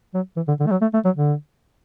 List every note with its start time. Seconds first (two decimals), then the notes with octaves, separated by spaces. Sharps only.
0.14 F#3
0.36 E3
0.48 D3
0.60 D3
0.67 A3
0.71 F#3
0.82 A3
0.94 A3
1.05 F#3
1.16 D3